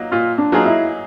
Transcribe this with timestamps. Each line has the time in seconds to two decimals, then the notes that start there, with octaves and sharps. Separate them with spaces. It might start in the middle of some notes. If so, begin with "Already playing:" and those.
Already playing: F#3 A#3 D#4
0.12 A#2 F4
0.38 D4
0.52 F#3 A#3 D#4 F4 G#4
0.65 E4